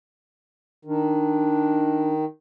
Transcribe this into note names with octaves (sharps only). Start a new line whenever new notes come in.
D#3 D4